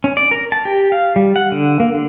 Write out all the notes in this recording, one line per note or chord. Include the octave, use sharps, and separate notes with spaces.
C#4
D5
A#4
A5
G4
F5
G3
F#5
D3
A#3
D3